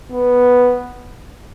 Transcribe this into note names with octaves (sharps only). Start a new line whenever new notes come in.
B3